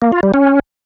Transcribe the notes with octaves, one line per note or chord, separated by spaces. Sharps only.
A#3
F4
G3
C#4